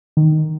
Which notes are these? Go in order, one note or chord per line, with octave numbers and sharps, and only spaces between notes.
D#3